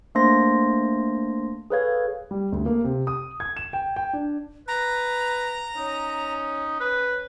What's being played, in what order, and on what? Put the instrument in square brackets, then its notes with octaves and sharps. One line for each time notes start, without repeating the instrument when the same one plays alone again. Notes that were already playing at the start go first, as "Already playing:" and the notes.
[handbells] A3 A#3 D4 C5 C6 A#6
G#4 A4 B4 C#5 F5 G#6
[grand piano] G3
D2
A#3
C3
D#6
G#6
E7
G5
G5
D4
[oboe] B4 [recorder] A#5
[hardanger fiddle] C#4 [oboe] D#4
[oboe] B4